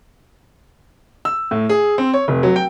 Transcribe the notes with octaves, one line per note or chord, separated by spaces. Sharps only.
E6
A2
G#4
C4
C#5
F1
F#3
G5